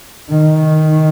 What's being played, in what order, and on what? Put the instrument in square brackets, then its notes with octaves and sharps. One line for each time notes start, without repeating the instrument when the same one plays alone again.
[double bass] D#3